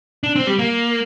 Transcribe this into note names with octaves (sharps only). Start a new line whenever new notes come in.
D4
C4
G3
A#3